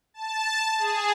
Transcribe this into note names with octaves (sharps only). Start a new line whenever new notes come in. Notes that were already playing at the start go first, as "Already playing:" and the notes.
A5
G#4